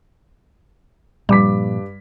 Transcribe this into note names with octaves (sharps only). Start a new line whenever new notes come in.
G2 A#2 F3 G3 D6 B6